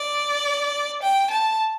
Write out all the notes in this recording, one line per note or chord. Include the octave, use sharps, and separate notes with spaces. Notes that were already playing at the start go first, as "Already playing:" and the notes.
Already playing: D5
G5
A5